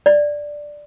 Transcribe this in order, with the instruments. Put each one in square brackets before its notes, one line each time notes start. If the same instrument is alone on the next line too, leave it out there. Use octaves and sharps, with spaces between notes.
[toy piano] D5